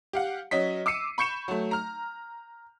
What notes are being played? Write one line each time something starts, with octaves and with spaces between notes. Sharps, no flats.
G4 F5 F#5
F#3 C#4 D#5 B6
D6 E6 C7 C#7 D#7
B5 C#6 G6 C#7 E7
F#3 A3
A#5 F6